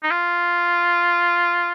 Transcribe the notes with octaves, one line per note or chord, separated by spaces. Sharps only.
D#4
F4